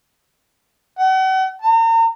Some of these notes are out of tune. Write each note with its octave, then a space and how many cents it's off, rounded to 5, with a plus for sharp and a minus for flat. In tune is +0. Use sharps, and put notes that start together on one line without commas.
F#5 +40
A#5 -40